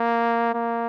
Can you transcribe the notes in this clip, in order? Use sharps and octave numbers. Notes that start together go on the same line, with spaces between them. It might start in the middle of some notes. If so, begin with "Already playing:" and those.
Already playing: A#3
A#3